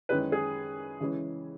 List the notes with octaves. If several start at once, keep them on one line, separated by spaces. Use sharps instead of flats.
F#2 D#3 G#3 C#4 E4 B4
G#4
C#3 E3 G#3 C#4 E4